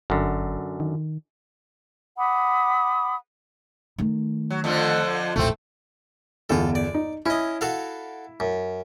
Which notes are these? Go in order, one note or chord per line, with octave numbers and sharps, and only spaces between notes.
G1 F#2 D3
D#3
F#5 B5 D6 D#6
D#3 A3
F#3
F2 D3 F3
D#1 A1 A3 C4
G1 E2 F4 A4
D5
D#4
C#4 E4 D#5
F#4 A4 F5
F#2